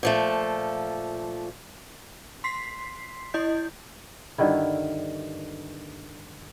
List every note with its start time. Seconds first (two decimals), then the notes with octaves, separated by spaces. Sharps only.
0.03 A#2 F3 A3
2.44 C6 B6 C7
3.34 E4 D#5 G6
4.38 G2 D3 D#3 E4